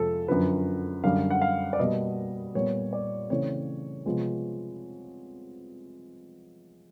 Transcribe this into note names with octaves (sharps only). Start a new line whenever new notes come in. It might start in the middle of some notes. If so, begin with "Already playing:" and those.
Already playing: F2 C3 F3 G#3 C4 A4
F#2 D3 F3 B4
F#2 D3 G3 F5
F#5
F5
D5
B2 G3 A#3 D#5
A#2 G3 B3 C#5
D5
C#3 E3 A3 C4 C#5
C3 F3 G#3 B3